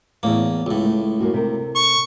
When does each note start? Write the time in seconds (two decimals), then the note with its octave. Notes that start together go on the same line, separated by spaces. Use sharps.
0.23 E2 A2 A#3 C#5
0.66 C#2 A2
0.85 A3
1.21 F#2 A#3 F#4
1.34 C3 A4 A#4
1.76 C#6